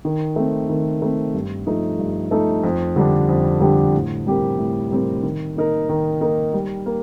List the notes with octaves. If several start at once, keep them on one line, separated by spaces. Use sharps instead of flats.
D#3
A3 C4
D#3
A3 C4
G2
F3 A3 D#4 A4
G2
F3 A3 D#4 A4
F2
D3 G3 D4 G4
F2
D3 G3 D4 G4
A2
G3 C4 G4 A#4
A2
G3 C4 G4 A#4
D#3
A#3 D#4 A#4
D#3
A#3 D#4 A#4
G3
A#3